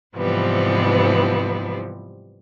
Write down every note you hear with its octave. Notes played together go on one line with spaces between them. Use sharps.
G#2 C3 E3 F3 G3 B3